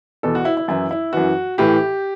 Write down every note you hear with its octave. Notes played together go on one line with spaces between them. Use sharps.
E2 B2 A4
F#4
E4
E4
F#2 E3 E4
E4
F#2 E3 F#4
A2 E3 G4